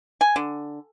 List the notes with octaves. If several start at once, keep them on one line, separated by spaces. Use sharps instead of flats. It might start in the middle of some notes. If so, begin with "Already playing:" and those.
G#5
D3